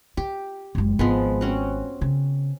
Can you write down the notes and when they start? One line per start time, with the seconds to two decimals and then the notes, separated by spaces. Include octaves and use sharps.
0.17 F4 G4
0.75 F#1 G#3
0.99 G#1 F3 G#3 B3
1.41 C4 C#4 F#4
2.01 C#3